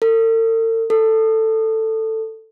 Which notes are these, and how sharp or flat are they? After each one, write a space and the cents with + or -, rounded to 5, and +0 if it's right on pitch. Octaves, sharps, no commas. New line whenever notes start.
A4 +45
A4 +10